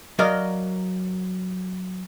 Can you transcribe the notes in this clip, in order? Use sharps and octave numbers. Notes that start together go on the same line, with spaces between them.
F#3 A#4 D5 D#5 F5